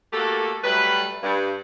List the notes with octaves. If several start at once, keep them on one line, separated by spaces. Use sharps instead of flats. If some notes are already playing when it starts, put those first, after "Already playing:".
A3 A#3 F#4 G4 A4
F#3 G3 A3 B4
G2